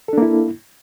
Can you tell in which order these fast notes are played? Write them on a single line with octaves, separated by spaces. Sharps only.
A4 D4 A#3 E4